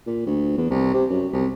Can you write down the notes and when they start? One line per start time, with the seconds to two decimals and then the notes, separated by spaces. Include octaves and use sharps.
0.07 A#2
0.27 D2
0.57 E2
0.70 C2
0.94 C3
1.10 F#2
1.33 C2